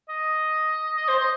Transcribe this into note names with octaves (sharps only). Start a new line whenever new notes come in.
D#5
D#5
C5
D#5